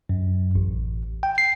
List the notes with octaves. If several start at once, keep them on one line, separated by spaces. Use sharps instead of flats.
F#2
A1
G5
C7